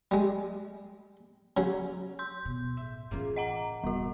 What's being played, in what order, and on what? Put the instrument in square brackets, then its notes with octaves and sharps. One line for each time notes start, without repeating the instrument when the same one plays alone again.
[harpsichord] G3 G#3
C#3 F#3
[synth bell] C6 G6
[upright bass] B2
[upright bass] A2 [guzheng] E5
[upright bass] A2 E3 [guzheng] C#3 A#3 F4
[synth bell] D#5 F#5 A#5
[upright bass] D1 C#3 [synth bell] G3 F#4